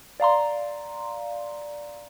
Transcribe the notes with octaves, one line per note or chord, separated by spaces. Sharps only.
D5 F5 A#5 C6